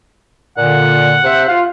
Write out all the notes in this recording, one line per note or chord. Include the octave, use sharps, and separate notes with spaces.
A#2 D3 F#5
C3 C5 E5
F4 F5